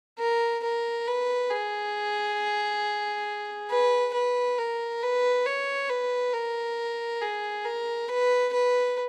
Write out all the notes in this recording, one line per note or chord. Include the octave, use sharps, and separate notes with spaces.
A#4
A#4
B4
G#4
B4
B4
A#4
B4
C#5
B4
A#4
G#4
A#4
B4
B4